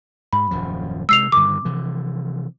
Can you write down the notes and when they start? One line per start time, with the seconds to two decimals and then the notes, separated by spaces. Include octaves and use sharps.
0.33 G#2 B5
0.51 D#1 F#2 F3
1.09 C3 G#3 E6 C7 F7
1.32 G2 D3 D#3 D6
1.65 C3 E3 F3